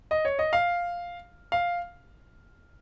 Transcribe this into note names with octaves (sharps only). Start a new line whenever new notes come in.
D#5
C#5
D#5
F5
F5